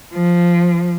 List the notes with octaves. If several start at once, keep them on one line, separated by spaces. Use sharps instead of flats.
F3